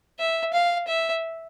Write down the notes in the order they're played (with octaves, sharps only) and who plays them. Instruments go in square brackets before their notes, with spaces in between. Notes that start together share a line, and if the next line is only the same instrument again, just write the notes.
[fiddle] E5
F5
E5